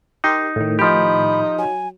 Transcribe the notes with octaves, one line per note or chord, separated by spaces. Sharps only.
D#4 G4 A#4 C6
A2 D#3
F3 D#4 G4 B5
F#3 G#5